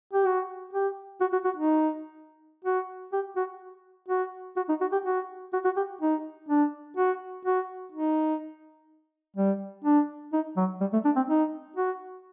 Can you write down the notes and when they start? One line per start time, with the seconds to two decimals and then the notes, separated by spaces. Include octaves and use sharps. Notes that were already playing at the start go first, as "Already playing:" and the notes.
0.13 G4
0.25 F#4
0.73 G4
1.21 F#4
1.32 F#4
1.45 F#4
1.57 D#4
2.64 F#4
3.13 G4
3.36 F#4
4.08 F#4
4.56 F#4
4.69 D#4
4.81 F#4
4.92 G4
5.05 F#4
5.53 F#4
5.65 F#4
5.77 G4
6.01 D#4
6.49 D4
6.97 F#4
7.45 F#4
7.92 D#4
9.36 G3
9.84 D4
10.33 D#4
10.57 F#3
10.81 G3
10.93 A3
11.05 D4
11.16 C4
11.29 D#4
11.76 F#4